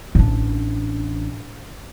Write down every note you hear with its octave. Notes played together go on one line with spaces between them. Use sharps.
A1 D4